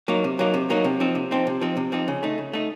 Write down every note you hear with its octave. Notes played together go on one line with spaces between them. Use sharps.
F#3 A#3 D#4
C3
F#3 A#3 D#4
C3
F#3 A#3 D#4
C3
F3 C4 D#4
C3
F3 C4 D#4
C3
F3 C4 D#4
C3
F3 C4 D#4
C#3
A3 D#4
C#3
A3 D#4